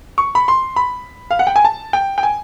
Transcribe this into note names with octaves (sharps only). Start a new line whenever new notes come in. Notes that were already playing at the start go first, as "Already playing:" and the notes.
C#6
B5
C6
B5
F5
F#5
G5
G#5
A5
G5
G5
G#5